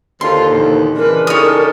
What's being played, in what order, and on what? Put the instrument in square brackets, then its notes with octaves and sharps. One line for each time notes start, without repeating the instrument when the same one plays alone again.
[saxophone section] D#2 D3 D#3 [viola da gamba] F4 [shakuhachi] C5 [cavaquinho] C6
[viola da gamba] E2 A#2
[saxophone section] C#3 G#3 D4 [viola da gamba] E3 B4 [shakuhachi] A#4
[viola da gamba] D#4 G4 A4 [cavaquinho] C#5 D#6